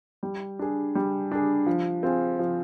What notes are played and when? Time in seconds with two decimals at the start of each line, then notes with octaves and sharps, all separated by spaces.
0.23 G3
0.59 D4 G#4
0.95 G3
1.32 D4 G#4
1.66 F3
2.03 C4 F4 G#4
2.39 F3